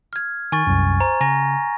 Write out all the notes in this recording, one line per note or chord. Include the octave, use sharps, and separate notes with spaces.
F6 G#6
D#3 G#5 C#6 A6
C2 F#2
C5 A#5
C#3 G#5 A#5 A#6